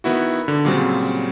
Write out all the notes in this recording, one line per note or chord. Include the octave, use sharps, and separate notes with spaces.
D#3 B3 E4 F#4
D3
A#2 C#3 F#3 G3 C4